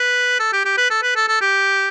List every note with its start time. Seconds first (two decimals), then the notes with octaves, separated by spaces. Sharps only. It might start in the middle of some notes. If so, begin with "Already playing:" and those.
Already playing: B4
0.40 A4
0.53 G4
0.65 G4
0.78 B4
0.90 A4
1.03 B4
1.16 A4
1.28 A4
1.41 G4